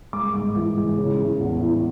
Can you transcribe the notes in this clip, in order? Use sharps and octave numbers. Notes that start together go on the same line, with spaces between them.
G#3 D6
G#2
E3
G#3
C#3
E3
E2
E3